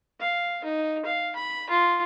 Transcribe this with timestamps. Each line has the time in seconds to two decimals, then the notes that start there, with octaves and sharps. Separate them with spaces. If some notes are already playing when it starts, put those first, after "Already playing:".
0.20 F5
0.64 D#4
1.05 F5
1.36 B5
1.69 F4